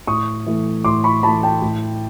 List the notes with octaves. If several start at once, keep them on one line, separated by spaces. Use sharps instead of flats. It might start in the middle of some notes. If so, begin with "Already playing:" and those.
A2 C#6 D#6
E3 A3
A2 C6 D6
B5 C#6
E3 A3 A5 B5
G5 A5
A2